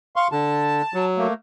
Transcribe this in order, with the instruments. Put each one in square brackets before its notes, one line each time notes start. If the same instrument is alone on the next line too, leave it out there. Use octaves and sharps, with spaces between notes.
[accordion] F5 C6 C#6
[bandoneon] D3 [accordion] A5
[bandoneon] F#3
[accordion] A3 A#3